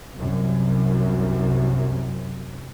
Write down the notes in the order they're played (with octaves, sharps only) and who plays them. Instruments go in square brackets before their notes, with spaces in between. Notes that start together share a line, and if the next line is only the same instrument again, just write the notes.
[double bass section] C2 F#2